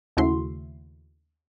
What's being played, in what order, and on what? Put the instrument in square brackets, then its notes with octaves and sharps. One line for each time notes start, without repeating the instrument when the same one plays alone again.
[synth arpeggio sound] D#2 C#3 A3 E4 F#4 C6